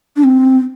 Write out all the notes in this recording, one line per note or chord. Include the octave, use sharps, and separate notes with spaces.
D4
C4